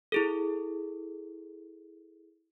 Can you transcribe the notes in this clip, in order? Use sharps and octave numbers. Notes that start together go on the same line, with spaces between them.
E4 G#4 A4